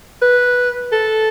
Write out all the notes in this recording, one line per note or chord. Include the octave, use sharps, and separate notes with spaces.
B4
A4